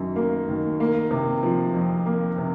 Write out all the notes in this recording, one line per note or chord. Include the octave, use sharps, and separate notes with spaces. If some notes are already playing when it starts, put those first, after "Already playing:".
Already playing: F#2 D#3 F#3
A#3
D#3
A#3
C3
F3
F2
A#3
C3